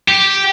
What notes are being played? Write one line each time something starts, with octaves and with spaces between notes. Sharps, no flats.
G4